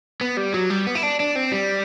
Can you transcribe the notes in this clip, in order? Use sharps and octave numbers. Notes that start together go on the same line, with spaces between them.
B3
G3
F#3
G3
B3
E4
D4
D4
C4
G3